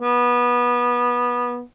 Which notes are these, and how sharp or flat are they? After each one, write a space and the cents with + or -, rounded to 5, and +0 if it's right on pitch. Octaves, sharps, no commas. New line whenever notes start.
B3 -20